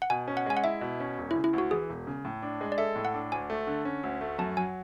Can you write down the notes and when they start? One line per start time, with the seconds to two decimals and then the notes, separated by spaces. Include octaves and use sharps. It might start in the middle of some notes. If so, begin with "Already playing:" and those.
0.02 F#5
0.10 B2 G#5
0.28 C#4
0.37 F#5
0.46 G#3 G#5
0.57 F#5
0.64 E4 E5
0.81 B2
1.00 C#4
1.18 E1
1.31 E4
1.36 C#3
1.44 E4
1.53 D2 F#4
1.71 E3 G#4
1.89 E1
2.07 C#3
2.25 A2
2.42 D4
2.61 G#3
2.72 D5
2.78 A4 E5
2.96 A2
3.05 F#5
3.14 D4
3.32 D2 G#5
3.50 A3
3.67 D3
3.85 C#4
4.03 D2
4.21 A3
4.38 F#2 A5
4.57 F#3 G#5